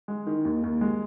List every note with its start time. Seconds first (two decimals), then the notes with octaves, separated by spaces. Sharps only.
0.08 G#3
0.27 D#3
0.45 D#2
0.63 D#2
0.81 G#3